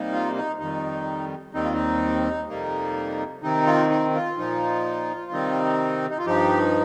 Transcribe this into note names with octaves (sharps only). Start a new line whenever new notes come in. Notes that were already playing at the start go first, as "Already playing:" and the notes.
Already playing: C3 G3 A#3 D#4
F4
D#4
F2 D#3 G3 D#4
D#2 D#3 G3 C4 D#4
F4
D#4
F2 C3 G3 A#3 D#4
C3 D#3 C4 D#4
F4
D#4
F4
A#2 F3 D#4
C3 D#3 G3 C4 D#4
D#4
F4
G2 F3 D#4 G4